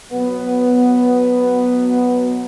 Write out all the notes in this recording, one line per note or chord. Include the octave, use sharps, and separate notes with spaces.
B2 F#3 B3